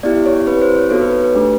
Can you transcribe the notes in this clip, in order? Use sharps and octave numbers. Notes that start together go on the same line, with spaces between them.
B3 E4 G4 D5
C#5
C4 E4 G4 B4
C5
C#5
B3 D#4 F#4 A4 C#5
B4
B4
B4
A3 D4 G4